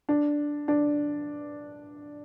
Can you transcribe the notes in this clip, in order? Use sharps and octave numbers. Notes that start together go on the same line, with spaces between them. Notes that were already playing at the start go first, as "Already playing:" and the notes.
D4
D4